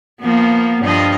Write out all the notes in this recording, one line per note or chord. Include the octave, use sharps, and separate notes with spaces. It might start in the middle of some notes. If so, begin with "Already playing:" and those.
F3 A#3 B3
G2 F3 D#5